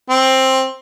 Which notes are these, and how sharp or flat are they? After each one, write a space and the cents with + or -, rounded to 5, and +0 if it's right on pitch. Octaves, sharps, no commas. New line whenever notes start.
C4 +10